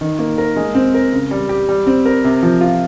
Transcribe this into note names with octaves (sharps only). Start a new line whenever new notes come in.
D#3
A#3
A#4
G#3
C4
A#4
C#3
G3
G4
G3
C4
A#4
C3
F3
F4